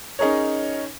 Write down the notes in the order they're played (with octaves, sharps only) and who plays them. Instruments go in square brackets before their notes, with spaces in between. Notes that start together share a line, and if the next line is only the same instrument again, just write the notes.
[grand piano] C#4 D#4 G#4 A#4 C#5